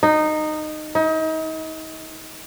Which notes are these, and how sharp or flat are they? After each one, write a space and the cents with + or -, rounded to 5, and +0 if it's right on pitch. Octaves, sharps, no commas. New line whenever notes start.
D#4 -15
D#4 +35